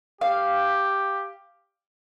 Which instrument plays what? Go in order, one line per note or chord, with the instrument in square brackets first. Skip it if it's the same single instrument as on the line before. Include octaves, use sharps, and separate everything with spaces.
[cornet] G4 [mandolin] F5